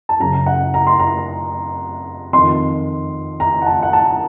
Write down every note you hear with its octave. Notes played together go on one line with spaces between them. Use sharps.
A5
F#2 C#3 A#5
F#5
A#5
C6
A#5
F2 D#3 C6
A#5
F#5
A5
F#5
A5